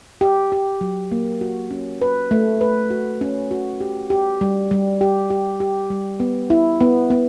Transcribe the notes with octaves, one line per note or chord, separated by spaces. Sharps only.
G4
G4
F#3
A#3
F#4
C#4
B4
A3
B4
F#4
C#4
F#4
G4
G4
G3
G3
G4
G4
G4
G3
B3
E4
B3
B3